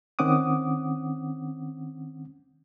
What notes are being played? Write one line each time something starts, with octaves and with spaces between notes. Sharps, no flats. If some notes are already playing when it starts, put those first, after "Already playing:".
D#3 C4 C#4 F#5 D6 D#6